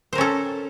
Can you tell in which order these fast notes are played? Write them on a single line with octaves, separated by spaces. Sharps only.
C5 A#4 C#4 A4